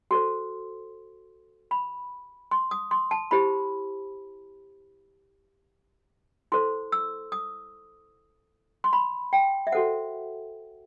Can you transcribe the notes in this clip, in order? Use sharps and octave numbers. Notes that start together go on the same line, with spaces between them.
F#4 A4 C5 C6
B5
C6
D#6
C6
A5
E4 G4 C5 B5
E4 A4 C5 C6
E6
D#6
C6
B5
G5
E5
F#4 A4 C5 F#5